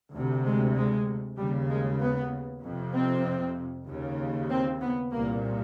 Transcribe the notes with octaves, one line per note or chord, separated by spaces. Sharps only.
D2 C3
G#3
G#3
D#2 C#3 G3
G#3
B3
F2 C3
C4
D#2 C#3
C4
B3
C2 A#2 A#3